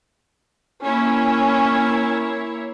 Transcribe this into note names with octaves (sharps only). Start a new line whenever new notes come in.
A#3 C#4 E4 C#5